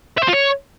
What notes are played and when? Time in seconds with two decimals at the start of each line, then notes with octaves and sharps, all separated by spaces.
0.18 E5
0.23 C5
0.28 F4
0.33 C#5